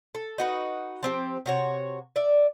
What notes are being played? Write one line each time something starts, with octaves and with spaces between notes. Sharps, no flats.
A4
D#4 F#4 B4
F3 C4 G4
C3 F#4 C#5
D5 E5